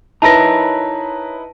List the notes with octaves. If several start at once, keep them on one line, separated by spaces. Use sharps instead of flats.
D#4 E4 A#4 B4 C#5 A5 A#5 A#6